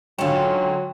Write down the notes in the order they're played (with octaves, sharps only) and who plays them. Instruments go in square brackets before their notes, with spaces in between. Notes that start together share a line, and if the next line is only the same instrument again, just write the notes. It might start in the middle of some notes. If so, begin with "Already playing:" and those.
[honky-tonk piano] G#2 D3 [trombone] F#3 [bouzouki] C#4 F4 [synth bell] G5